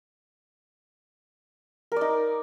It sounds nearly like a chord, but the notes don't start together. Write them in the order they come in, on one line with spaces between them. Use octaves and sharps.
A#4 D5 D#4